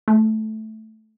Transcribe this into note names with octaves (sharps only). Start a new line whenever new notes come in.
A3